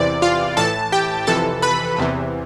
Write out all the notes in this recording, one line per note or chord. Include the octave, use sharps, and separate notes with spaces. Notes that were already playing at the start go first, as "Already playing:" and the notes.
Already playing: E2 C3 E3 D5
F4 F5
A2 E3 A4 A5
G4 G5
F2 C3 E3 A4 A5
B4 B5
E2 C3 E3